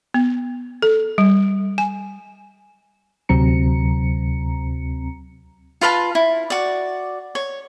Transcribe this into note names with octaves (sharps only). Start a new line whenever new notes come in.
B3
A4
G3
G#5
D2 C3 F#3 C4 A#5 C#7
F4 B4 F5 A5
E4
F#4 D5
C#5